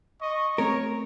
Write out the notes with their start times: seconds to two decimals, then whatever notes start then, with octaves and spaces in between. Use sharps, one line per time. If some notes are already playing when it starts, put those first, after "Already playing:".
0.21 D#5 C#6
0.58 A3 C4 C#4 A#4 C#5